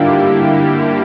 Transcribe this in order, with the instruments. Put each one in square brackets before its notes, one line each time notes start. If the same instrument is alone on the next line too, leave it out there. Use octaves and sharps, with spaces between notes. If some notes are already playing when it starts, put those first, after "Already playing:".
Already playing: [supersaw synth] D3 G3 A#3 E4 G4 [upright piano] D4 F4